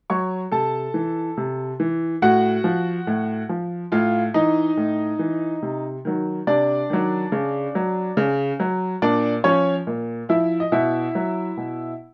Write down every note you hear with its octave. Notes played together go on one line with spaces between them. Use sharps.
F#3 C#5 C#6
C3 A4 A5
E3
C3
E3
A2 F#4 F#5
F3
A2
F3
A2 F4 F5
E3 D#4 D#5
A2
E3
C3
D#3 F#3
C3 D4 D5
D#3 F#3
C#3
F#3
C#3
F#3
A#2 D4 D5
F3 C#4 C#5
A#2
F3 E4 E5
D#5
B2 E4 E5
F#3
B2